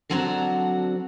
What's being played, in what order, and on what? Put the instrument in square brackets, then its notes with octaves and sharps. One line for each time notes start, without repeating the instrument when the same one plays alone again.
[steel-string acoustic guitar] D3 F#3 C4 D4 F#4 A#5